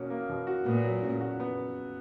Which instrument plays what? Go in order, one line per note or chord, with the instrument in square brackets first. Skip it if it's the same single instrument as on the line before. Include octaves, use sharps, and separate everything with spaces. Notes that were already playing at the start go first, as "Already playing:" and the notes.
Already playing: [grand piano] B2 A#3 C#4 F#4
A#3
B2
F#4
[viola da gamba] A#2 [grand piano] B3
[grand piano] F#3
C#3
F#4
B3